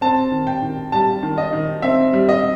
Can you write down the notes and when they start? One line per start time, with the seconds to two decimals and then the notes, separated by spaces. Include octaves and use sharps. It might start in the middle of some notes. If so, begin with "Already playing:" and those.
0.01 C4 A5
0.31 D#3
0.47 G5
0.62 D#3
0.92 G3 A5
1.23 D#3
1.38 D#5
1.53 D#3
1.82 C4 E5
2.13 G3
2.29 D#5